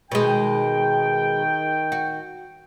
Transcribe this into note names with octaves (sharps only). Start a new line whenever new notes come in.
B2 D#3 G#3 G5
F#4